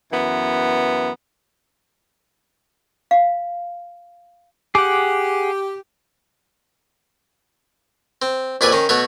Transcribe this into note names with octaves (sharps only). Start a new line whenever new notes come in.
F#2 E3 B3
F5
G4 G#4 F#5 D6
C4
A#1 F2 E4 B4 D5 G#5
D#3 C#4
B2 A3 F#4 C#5